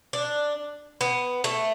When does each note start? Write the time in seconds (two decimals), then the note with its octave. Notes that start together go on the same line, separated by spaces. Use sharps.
0.13 D4
1.01 B3
1.44 A3